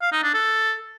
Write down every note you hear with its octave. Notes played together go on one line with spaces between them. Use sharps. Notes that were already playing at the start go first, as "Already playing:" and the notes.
F5
D#4
D4
A4